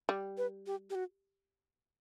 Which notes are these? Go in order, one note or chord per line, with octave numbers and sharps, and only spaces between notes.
G3
B4
G4
G4
F#4